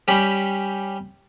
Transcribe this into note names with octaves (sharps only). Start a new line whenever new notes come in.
G3 C#4 G4 B5